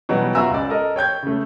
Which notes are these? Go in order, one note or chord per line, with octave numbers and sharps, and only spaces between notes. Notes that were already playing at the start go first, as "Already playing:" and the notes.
B2 E3 F#3 G3 B3
F4 F#4 E5 G#5 A#5 E6
C#2 D5
A4 A#4 D#5
C#5 G5 G6 G#6
C#3 A3